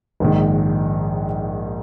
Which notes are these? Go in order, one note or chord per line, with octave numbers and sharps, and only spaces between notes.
A#1 G#2 D#3